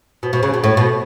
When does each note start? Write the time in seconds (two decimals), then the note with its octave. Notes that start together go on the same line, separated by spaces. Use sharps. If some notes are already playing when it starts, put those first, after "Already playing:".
0.23 B2
0.33 B2
0.43 C#3
0.54 B2
0.64 A2
0.77 B2